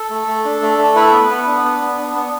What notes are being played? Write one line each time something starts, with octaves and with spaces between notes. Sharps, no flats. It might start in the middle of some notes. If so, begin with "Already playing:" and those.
Already playing: A4
A3
A3
D4
A3
A3
E4 B4
B3
B3
D4
B3
B3
D4
B3